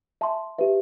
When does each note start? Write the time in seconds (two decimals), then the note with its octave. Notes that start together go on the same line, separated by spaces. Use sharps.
0.21 E5 A5 C6
0.59 G4 B4 E5